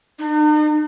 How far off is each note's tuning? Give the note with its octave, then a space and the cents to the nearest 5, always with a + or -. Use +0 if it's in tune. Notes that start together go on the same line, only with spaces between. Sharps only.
D#4 -45